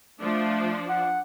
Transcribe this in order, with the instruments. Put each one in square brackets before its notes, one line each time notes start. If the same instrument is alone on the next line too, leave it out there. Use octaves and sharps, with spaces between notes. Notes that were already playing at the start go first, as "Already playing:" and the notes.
[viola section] F3 D4 [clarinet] A3
[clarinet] F#5